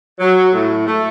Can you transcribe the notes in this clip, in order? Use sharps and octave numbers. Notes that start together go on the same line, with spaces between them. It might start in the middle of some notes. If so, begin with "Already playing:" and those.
F#3
A2
A3